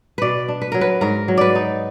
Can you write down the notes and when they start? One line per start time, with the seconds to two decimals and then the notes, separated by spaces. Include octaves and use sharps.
0.18 B2 B4 D5
0.48 D4
0.62 B4
0.72 F#3 A#4
0.81 B4
1.01 G#2 A#4
1.28 F#3
1.37 B4 D5
1.55 D#4